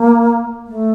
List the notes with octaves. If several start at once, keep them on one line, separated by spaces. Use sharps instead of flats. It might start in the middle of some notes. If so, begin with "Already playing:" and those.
Already playing: A#3
A3